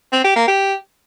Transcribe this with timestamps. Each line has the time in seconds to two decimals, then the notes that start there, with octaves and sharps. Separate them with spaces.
0.12 C4
0.24 G4
0.36 A#3
0.47 G4